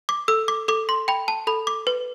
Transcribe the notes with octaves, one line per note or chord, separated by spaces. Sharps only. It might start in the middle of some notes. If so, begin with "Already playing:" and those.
D6
A4 E6
D6
A4 D6
C6
G5 B5
A5
A4 B5
D6
B4